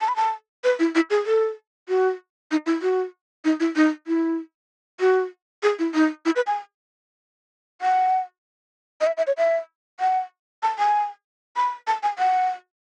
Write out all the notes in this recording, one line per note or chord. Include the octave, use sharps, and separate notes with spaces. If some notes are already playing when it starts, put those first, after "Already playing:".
A5
B5
A5
B4
E4
E4
G#4
A4
F#4
D#4
E4
F#4
D#4
E4
D#4
E4
F#4
G#4
E4
D#4
E4
B4
G#5
F#5
D#5
E5
E5
C#5
E5
F#5
A5
G#5
B5
A5
G#5
F#5